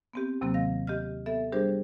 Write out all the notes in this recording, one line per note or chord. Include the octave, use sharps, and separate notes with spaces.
B3 C4 G4
D#2 C3 F#3 A#3 C4
D#3 F5 A#6
G4 D#5 F6
B3 A4 E5 A6
G3 D4 G4 G#4 A#4 C5